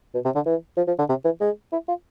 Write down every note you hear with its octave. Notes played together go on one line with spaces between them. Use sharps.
B2
C3
D3
E3
F3
F3
D3
C3
E3
G#3
E4
F4